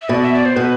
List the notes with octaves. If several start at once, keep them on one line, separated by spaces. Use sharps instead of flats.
E5
B2 D5
E5
D5
C5
B2 B4